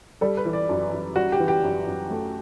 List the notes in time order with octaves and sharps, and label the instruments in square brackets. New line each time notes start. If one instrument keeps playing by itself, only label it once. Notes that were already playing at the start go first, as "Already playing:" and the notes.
[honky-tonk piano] G3 [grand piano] A4
[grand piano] B4
[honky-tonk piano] E3
[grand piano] D5
[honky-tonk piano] F#2
F#2
[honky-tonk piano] G3 [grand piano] F#4
[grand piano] G4
[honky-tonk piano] E3
[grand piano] G4
[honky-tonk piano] F#2
F#2
A3